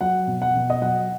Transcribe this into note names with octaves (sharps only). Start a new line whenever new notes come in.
F#3 F#5
B2
F#5
B2
D#5
F#3 F#5